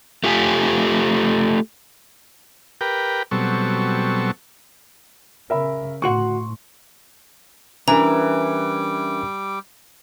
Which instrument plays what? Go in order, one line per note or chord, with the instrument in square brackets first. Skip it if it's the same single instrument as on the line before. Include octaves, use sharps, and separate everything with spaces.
[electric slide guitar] A3 F4 G4 G#5
[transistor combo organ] G4 A#4 B4 G5
B2 F#3 G3 C4 A4 C#6
[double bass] C#3 [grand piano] A#4 E5 B5
[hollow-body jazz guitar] D2 F#4 F#5 [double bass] A2 [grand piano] C6 C#6
[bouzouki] E3 [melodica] G3 D6 [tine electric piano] C#4 D4 A#4 [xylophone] A#5